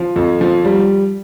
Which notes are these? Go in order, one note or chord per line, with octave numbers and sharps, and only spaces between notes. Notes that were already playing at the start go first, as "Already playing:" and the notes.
Already playing: F3
F2
F3
G3